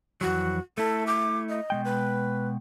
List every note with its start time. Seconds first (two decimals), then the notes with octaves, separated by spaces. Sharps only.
0.21 F2 E3 F#3 F#4
0.78 A3 E4 A4
1.07 D6
1.49 D#5
1.70 B2 G#3 G5
1.85 B4